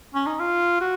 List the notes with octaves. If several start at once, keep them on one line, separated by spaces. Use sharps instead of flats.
C#4
D#4
F4
F#4